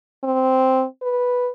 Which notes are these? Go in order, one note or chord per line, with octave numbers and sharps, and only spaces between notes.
C4
B4